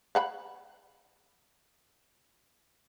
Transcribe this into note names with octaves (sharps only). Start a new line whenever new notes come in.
F5 F#5 B5